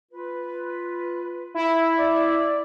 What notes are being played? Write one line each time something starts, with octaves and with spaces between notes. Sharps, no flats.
F4 B4
E4
D5